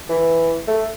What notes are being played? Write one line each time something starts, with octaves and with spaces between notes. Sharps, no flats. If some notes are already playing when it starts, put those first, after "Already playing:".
E3
A3